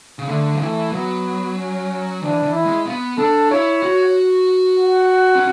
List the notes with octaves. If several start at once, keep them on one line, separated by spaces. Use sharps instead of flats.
C#3
D3 A3
F#3
E3 A3
F#3 B3
C#4
E3 D4
E3
E4
G#3
B3
D4 A4
E4 C#5
F#4
F#5
C#4